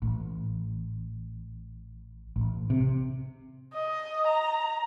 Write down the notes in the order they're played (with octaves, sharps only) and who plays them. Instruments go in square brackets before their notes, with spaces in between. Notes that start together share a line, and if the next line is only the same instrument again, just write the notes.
[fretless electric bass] A1
A1
C3
[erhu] D#5
A#5